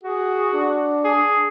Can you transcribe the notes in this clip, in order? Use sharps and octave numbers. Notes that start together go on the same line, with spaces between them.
F#4 G#4
D4
G#4